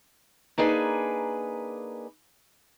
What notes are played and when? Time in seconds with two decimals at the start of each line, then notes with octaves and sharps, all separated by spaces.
0.58 A#3 D4 D#4 G#4 B4